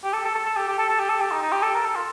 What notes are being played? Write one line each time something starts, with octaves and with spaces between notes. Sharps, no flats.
G4
A4
A4
A4
A4
G4
G4
A4
A4
G4
A4
G4
D#4
D#4
G4
A4
A#4
A4
F4